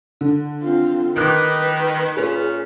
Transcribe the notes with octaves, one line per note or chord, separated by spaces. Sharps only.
D3
C4 F4
D#3 B4 D6 F#6 D7
A#2 C#4 G#4